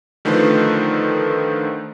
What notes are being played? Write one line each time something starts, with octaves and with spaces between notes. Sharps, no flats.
D3 D#3 F3 A3 B4 C5